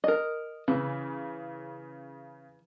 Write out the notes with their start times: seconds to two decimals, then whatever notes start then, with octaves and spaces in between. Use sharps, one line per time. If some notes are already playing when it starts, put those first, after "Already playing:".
0.04 A#4 D#5
0.68 C#3 E3